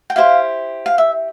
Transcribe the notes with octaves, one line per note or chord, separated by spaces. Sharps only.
G5
E4 G4 C5 F5
F5
E5